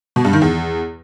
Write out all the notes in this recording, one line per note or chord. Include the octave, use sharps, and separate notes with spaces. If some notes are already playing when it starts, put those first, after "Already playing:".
B2
G2
D#3
E2